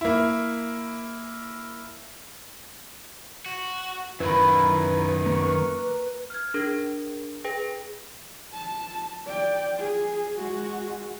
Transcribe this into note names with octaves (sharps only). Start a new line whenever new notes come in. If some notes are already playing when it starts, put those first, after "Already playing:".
A#3 E4
F#4
F#2 D#3 E4 A#4 B4 B5
A#3 A#4 C#6
F6 G#6
D4 G#4 A#4
G#4 B4 G5
A5
D5 G5
G#4
G#3 F#4